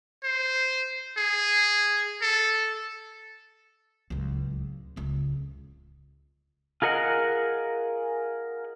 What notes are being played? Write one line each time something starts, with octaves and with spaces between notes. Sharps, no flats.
C5
G#4
A4
D1 C#2
D1 C#2
F4 G#4 A#4 D#5 F#5